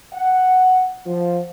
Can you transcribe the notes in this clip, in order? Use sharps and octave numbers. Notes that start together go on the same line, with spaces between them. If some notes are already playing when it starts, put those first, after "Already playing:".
F#5
F3